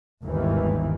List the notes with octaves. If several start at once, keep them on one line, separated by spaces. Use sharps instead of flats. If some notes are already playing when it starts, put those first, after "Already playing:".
G1 D#2 G#2 D#3 E3